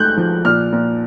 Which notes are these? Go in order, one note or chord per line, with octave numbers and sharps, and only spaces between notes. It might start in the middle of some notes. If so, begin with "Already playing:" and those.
Already playing: G#2 A3 F#6 G6
F3
A#2 F6
A#2